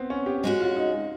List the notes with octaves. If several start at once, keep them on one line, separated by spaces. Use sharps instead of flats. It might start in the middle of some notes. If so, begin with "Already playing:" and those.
Already playing: B3 C4
C#4
G4
G#3 C#4 F#4
F4
D#4